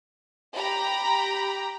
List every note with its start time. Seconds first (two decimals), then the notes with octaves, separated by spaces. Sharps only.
0.55 G4 G5 A#5 B5